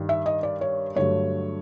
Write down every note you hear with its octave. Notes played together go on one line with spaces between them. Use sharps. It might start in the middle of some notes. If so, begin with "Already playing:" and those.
Already playing: G2 D#3 G3
E5
D#5
D5
C#5
G2 D3 F#3 A3 C#5